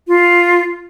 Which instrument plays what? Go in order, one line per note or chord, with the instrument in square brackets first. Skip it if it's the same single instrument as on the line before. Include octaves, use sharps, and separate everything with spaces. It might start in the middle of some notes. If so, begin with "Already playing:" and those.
[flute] F4